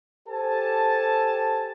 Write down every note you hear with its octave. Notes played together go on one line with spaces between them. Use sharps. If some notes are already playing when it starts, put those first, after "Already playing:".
G4 A4 C5 G#5 A5